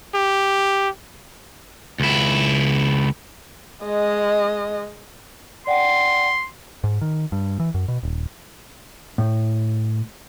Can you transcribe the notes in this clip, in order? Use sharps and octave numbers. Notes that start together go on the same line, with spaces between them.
G4
C#2 E4
G#3 D#5
D5 F#5 G5 C6
G#2
D#3
G2
E3
F#2
B2
D#1
A2